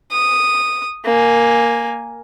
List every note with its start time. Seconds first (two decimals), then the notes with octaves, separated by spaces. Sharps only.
0.12 D#6
1.05 A#3 G#5